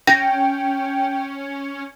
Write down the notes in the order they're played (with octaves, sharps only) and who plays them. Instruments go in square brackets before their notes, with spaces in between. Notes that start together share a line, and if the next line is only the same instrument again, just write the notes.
[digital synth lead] C#4 [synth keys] G5 [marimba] A#6